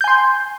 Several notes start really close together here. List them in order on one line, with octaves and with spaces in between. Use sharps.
G6 G#5 C6